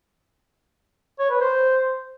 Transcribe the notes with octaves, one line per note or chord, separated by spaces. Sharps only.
C#5
B4
C5